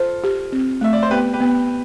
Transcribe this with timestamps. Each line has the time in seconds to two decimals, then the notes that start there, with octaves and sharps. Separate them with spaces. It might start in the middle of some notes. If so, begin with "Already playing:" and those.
Already playing: F4 A4 C5
0.24 G4
0.52 C4
0.81 A3 E5
0.93 D5
1.03 C5
1.11 B3 G4 B4
1.33 G4 B4
1.40 B3